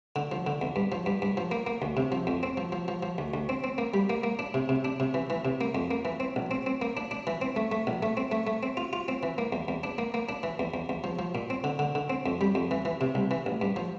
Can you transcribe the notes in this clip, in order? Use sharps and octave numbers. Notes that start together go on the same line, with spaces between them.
D3
F3
D3
E2
G2
F3
G2
G2
F3
A#3
A#3
D2
C3
F3
F2
C4
F3
F3
F3
F3
D2
D2
C4
C4
A#3
G3
A#3
A#3
D4
C3
C3
D4
C3
E3
E3
C3
A#3
F2
A#3
E3
C4
A#1
C4
C4
A#3
D4
D4
E3
C4
A3
A3
A#1
A3
C4
A3
A3
C4
F4
F4
C4
E3
A#3
E2
E2
D4
A#3
A#3
D4
E3
E2
E2
E2
F3
F3
A#2
C4
D3
D3
D3
C4
F2
G3
F2
E3
E3
C3
C2
E3
A1
G2
F3